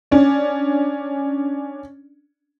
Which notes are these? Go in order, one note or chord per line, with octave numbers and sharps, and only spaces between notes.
C#4 D4